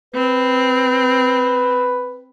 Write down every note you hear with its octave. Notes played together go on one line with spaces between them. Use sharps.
C4 B4